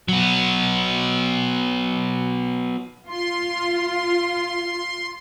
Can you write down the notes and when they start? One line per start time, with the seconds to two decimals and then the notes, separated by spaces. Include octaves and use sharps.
0.09 F#3 B3
3.07 F4 C6